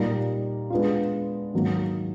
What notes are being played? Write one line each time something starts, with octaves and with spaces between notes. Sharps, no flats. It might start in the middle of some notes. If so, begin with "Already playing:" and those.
Already playing: A#2 G3 A#3 D#4
G#3 B3 D4 F4
G#2 D#3 F#3 A#3